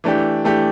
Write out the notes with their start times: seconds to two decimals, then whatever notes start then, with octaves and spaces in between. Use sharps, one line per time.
0.04 E3 A3 D4 G4
0.44 E3 A3 D4 G4